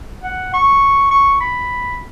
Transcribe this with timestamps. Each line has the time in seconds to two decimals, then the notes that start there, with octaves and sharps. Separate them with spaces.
0.24 F#5
0.54 C#6
1.11 C#6
1.41 B5